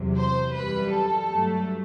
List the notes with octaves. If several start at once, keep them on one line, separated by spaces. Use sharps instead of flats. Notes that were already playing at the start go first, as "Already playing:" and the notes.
Already playing: E2 C3 F#3
C5
F#2 E3 G3 B4
A4
G2 F#3 A3